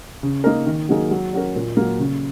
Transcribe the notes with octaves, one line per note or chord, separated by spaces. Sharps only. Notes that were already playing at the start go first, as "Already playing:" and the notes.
C#3
A#3 D#4 A#4
D#3
F#3 A#3 D#4 G#4
F#3
C#4 F#4 A#4
A#2
F#3 A#3
C#3